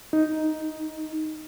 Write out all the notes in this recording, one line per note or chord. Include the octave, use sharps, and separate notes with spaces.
D#4